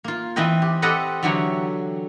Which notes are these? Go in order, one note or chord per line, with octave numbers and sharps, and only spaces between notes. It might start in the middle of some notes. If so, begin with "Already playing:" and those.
A#3 F4
E3 C4 B4 D#5 G5
G4
C4 G4 A4 B4 D#5 F#5
D3 E3 F#3 G4 C#5 E5